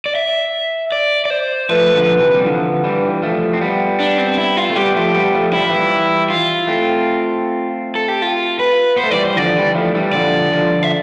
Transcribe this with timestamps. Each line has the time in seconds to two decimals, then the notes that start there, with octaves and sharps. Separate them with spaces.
0.06 D5
0.15 E5
0.92 D5
1.25 D5
1.30 C5
1.69 F3 A3 B4
1.94 D3 F3
2.20 C3 E3
2.35 G3
2.46 D3 F3
2.84 E3 G3
3.22 F3 A3
3.53 C4
3.61 G3 B3
4.00 D4
4.18 C4
4.38 E4
4.57 F4
4.70 A3
4.76 G3 B3 G4
4.95 F3 A3
5.15 G3 B3
5.34 F3 A3
5.52 G3 E4
5.61 F3
5.69 E3 G3
6.30 F4
6.67 A3 C4
7.95 A4
8.08 G4
8.22 F4
8.59 B4
8.96 B3 C5
9.04 A3
9.11 E3 G3 D5
9.23 C5
9.36 D3 F3 D5
9.56 E3 G3
9.75 F3 A3
9.95 E3 G3
10.13 D3 F3 D5
10.52 D3 F3
10.83 E5